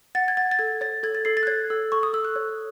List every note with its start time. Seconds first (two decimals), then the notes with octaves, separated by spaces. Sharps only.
0.15 F#5 A6
0.28 G#6
0.37 F#5 A6
0.51 A6
0.59 A4 G#6
0.81 C#5 A6
1.03 A4 G#6
1.15 A6
1.25 A4 C7
1.37 A6
1.43 F#6
1.47 C#5 G#6
1.70 A4 E6
1.92 A4 C#6
2.03 D#6
2.13 A4 E6
2.25 F#6
2.36 C#5